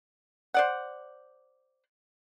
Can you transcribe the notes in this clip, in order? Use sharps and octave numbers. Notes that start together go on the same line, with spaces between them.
C5 D5 F#5